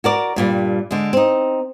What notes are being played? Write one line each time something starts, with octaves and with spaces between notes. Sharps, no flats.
F#4 A#4 D5
G2 A#2 G3
D3 G#3
C4 D#4